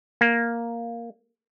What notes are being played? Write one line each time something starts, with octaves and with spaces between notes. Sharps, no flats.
A#3